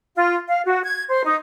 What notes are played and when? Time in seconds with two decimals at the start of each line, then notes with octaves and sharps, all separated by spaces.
0.16 F4
0.49 F5
0.66 F#4
0.84 G#6
1.10 C5
1.24 D#4